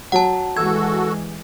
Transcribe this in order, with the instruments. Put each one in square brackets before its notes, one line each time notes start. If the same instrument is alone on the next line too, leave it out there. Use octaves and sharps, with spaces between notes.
[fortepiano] F#3 [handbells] F#5 A5
[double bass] E3 G#3 [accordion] F#4 A4 [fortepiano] E6 [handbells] G#6